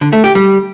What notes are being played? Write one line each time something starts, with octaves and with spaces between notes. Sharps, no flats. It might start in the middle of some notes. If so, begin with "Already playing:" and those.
D3
A3
G4
G3